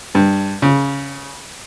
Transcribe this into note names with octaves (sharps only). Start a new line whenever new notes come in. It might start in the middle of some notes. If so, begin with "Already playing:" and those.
G2
C#3